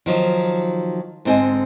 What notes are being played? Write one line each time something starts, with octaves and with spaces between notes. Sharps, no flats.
D#3 F3 F#3
G#2 D3 C4 D#5 G#5